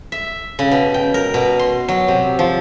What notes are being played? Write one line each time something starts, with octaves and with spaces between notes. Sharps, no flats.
E5
C#3
B2
G5
A#4
B2
C6
F#3
C3
F3